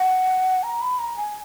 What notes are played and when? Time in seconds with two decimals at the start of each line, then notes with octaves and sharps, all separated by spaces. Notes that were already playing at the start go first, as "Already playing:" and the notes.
Already playing: F#5
0.63 A#5
0.81 B5
0.99 A#5
1.16 G#5